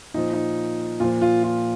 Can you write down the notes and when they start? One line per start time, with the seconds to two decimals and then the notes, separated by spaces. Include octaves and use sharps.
0.14 A#2 F3 D#4
0.33 D#4
1.00 A#2 F3 F4
1.21 F4
1.43 F4